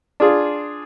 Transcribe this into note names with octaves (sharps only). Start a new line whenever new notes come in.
D4 F4 G#4